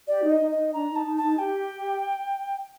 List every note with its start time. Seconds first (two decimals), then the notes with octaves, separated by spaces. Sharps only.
0.08 G4 D5
0.24 D#4
0.30 D#5
0.40 D#4
0.51 D#5
0.57 D#4
0.74 D4 A#5
0.90 D#4
0.96 A5
1.06 D#4
1.17 A5
1.22 D#4
1.39 G4 G5